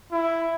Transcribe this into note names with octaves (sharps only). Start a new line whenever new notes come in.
E4